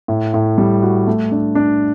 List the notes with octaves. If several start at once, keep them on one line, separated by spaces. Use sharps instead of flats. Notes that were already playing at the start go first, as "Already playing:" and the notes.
A2
A2
G3
F#4
A3
D4
D4